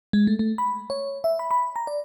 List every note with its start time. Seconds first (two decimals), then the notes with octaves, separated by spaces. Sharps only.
0.13 G#3
0.27 A3
0.39 A3
0.58 B5
0.90 C#5
1.24 E5
1.39 B5
1.51 B5
1.76 A#5
1.87 D5